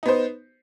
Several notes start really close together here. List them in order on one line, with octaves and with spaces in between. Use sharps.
D#4 B3 C5